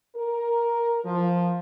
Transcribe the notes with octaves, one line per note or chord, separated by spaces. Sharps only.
A#4
F3